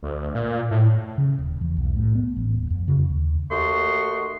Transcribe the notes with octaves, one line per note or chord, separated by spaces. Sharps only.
D2
A#2
A2
C#3
D#1
E2
B1
A2
B3
A1
D#1
F2
C#3
D#2
D#2 A3 F#4 D#5 C6 C#6